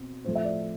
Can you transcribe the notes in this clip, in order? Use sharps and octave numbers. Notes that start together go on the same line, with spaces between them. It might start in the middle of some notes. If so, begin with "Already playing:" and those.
Already playing: B2 C4
A2 F3 A3 C5
E5
D5